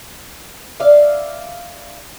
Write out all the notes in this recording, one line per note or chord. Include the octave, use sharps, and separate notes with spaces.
D5 E5 F5